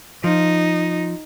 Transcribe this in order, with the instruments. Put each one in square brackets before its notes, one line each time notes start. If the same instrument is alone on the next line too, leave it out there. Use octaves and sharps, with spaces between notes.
[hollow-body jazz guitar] F3 [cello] D#4